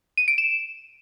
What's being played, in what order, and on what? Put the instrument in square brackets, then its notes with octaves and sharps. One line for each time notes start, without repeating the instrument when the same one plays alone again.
[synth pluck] D#7
D7
E7